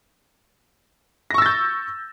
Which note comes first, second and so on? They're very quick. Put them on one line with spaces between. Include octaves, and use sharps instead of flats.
A#6 C#6 E6 A6 G6